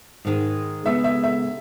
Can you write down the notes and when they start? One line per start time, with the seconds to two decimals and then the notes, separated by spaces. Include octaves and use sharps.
0.25 G#2 D#3 G#3
0.86 C#3 G#3 B3 E5
1.04 E5
1.24 E5